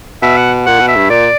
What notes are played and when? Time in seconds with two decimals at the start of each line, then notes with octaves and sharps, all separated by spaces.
0.22 B2 E5
0.37 F#5
0.66 A#2 F#5
0.80 B2
0.88 E5
0.96 G2
1.10 A#2 D5